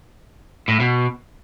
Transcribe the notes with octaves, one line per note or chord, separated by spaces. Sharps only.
A2
B2